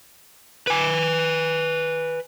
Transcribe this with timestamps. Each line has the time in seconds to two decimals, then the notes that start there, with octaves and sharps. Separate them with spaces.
0.67 B4 G#5